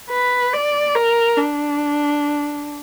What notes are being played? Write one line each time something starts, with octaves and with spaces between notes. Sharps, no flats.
B4
D5
A#4
D4